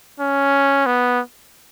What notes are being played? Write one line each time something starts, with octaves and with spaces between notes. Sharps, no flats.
C#4
B3